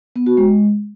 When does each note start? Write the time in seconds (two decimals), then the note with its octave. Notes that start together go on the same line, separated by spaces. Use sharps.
0.16 B3
0.26 F#4
0.37 G#3